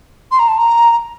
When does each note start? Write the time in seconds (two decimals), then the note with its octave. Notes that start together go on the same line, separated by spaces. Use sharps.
0.31 C6
0.39 A#5
0.48 A5
0.57 A#5